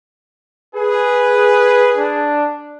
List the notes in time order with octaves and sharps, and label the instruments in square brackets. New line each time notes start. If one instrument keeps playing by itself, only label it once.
[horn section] G#4 [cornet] B4
[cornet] D4